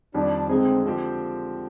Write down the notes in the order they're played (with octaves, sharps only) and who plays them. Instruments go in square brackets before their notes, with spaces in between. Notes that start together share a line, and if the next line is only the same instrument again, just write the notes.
[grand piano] F2 D#3 G3 [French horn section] D4
[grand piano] D3 G#3 D#4 G#4 [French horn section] C4
[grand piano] D3 F3 C4 G4